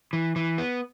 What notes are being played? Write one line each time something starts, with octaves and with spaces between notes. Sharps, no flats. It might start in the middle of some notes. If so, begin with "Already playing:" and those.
E3
E3
B3